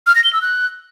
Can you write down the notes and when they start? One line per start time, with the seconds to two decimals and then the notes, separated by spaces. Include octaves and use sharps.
0.07 F6
0.15 A#6
0.24 G7
0.33 E6
0.42 F#6